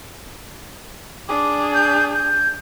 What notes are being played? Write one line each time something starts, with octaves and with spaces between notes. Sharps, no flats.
D4 G#4 D6
G6
G6